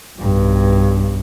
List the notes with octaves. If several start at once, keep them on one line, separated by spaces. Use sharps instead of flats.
B1 G2